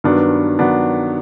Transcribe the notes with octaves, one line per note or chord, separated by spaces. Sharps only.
G2 D#3 F#3 B3 D4
D#3 F#3 B3 D4